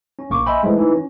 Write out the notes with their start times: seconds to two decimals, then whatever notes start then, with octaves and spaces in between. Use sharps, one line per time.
0.19 C#4
0.30 A#1 A#3 C#6 D6
0.46 D#5 E5 G5 G#5 B5 C6
0.63 E3 F3 G#3 A3
0.76 E3 D#4
0.94 C#4